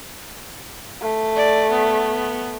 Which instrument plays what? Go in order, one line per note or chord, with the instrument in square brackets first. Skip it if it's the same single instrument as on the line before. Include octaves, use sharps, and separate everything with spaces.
[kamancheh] A3
[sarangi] D5
B3